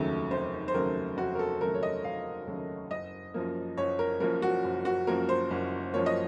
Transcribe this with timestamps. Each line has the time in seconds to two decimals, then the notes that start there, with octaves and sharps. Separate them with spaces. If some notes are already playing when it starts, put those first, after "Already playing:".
Already playing: F1 D#2 C#3 F#3 A3
0.31 F1 C5
0.68 C5
0.74 D#2 C#3 F#3 A3 A#4
1.17 F1 F#4
1.35 A#4
1.39 A4
1.61 D#2 C#3 F#3 A3 A#4
1.74 C#5
1.83 D#5
2.04 F1 F5
2.47 D#2 C#3 F#3 A3
2.91 F#1 D#5
3.34 F#2 F3 A#3
3.77 F#1 C#5
3.99 A#4
4.20 F#2 F3 A#3 A#4
4.42 F#4
4.64 F#1
4.85 F#4
5.07 F#2 F3 A#3 A#4
5.29 C5
5.51 F#1
5.94 F#2 F3 A#3 C#5
6.06 D#5